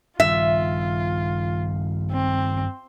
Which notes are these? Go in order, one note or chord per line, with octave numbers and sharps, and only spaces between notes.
G2 D#3 G3 F4 E5
C4